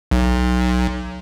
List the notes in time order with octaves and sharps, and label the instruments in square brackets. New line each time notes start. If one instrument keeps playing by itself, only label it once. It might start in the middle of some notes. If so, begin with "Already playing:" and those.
[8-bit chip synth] B1